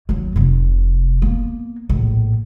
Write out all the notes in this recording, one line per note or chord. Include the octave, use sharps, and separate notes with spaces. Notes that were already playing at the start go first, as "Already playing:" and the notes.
D#2 F#3
F1 C3
A#3 B3
A#1 A2